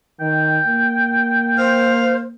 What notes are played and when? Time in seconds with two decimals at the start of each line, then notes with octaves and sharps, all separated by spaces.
0.20 D#3 G5
0.67 A#3
1.58 C5 F5